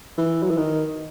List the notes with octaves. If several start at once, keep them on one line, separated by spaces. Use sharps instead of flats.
E3
F#3
E3
D#3